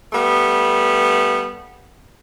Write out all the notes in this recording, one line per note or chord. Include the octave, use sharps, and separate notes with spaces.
G3 A3 B3